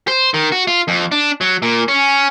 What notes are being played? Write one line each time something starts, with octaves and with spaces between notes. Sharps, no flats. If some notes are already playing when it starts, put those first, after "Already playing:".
C5
D#3
F#4
F4
F2
D4
F#3
A#2
C#4